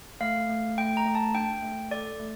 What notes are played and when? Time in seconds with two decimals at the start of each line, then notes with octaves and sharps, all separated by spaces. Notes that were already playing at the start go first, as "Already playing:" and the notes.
0.21 A3 F5
0.49 A3
0.78 A3 G5
0.97 A#5
1.06 A3
1.15 A5
1.34 D4 G5
1.63 A3
1.91 A4 D5
2.19 A3